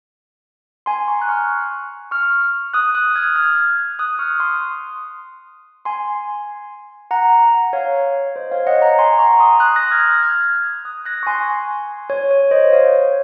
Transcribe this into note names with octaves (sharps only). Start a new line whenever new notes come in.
G#5 C6
A#5 C#6
F#6
C#6 F6
C#6 F6
D#6 F#6
D#6 F#6
F6 G#6
F6 G#6
D#6 F#6
C#6 F6
C6 D#6
G#5 C6
F#5 A#5
C#5 F5
C5 D#5
C#5 F5
D#5 F#5
F#5 A#5
G#5 C6
A#5 C#6
C6 D#6
D#6 F#6
F#6 A#6
F6 G#6
F6 G#6
D#6 F#6
F#6 A#6
C#6
G#5 C6
C#5
C#5
C5 D#5
C#5 F5